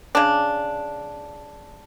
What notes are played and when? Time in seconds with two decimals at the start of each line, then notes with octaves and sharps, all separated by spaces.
0.15 C#3 D4